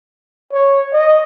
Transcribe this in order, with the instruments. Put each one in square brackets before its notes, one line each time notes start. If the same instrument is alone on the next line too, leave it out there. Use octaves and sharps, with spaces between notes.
[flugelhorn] C#5
D#5